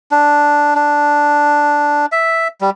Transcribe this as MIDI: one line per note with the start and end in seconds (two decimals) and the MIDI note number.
0.11 0.74 62
0.75 2.06 62
2.12 2.48 76
2.61 2.70 55